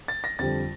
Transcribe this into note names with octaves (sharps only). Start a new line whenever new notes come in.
A6
A#6
F2 D3 G3 C4 A6